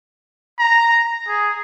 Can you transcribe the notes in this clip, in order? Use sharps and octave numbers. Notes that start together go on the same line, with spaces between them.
A#5
G#4